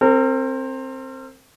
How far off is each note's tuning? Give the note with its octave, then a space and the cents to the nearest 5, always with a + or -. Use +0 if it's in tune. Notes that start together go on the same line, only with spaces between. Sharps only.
C4 +15 A#4 -35